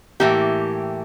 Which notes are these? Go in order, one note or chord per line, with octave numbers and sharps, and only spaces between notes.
A2 E3 A#3 G4